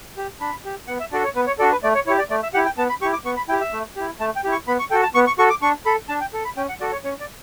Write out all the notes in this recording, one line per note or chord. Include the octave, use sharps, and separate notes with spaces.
G4
D4 B5
G4
B3 F#5
E5
D4 F#4 A4 D5
C#5
B3 B4
C#5
D4 F#4 A4 D5
B4
A3 D5
C#5
E4 G4 C#5
D5
A3 D5
E5
E4 G4 F#5
G5
B3 A5
B5
E4 G4 C#6
D6
B3 C#6
B5
E4 G4 G5
E5
A3
E4 G4
A3 A5
G5
E4 G4
C#6
B3 B5
C#6
F#4 A4 G5
A5
B3 C#6
C#6
F#4 A4 C#6
D6
D4 C#6
A4 B5
D4 A5
G5
A4
B5
C#4 G5
F#5
F#4 A4 D5
C#5
C#4 C#5
D5